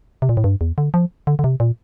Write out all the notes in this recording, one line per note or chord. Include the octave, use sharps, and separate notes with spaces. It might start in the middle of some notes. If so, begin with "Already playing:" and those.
C3
A#2
A2
G2
E2
D3
F3
D3
D3
C3
A#2